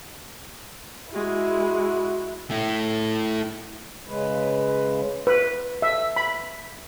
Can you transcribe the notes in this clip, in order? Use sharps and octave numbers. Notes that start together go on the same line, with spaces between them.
G#3 E4 F#4
A3 E4
C#3 G#3 B4
B4
E5
B5